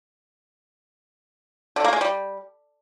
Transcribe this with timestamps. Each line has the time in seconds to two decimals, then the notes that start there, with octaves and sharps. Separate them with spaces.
1.76 D3
1.84 A#3
1.93 G#3
2.01 G3